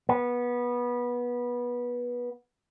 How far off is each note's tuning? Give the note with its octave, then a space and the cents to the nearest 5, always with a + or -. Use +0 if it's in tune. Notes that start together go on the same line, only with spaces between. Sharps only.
B3 -20